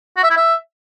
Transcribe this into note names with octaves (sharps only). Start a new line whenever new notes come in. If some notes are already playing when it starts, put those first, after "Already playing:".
F#4
E5
E4
E5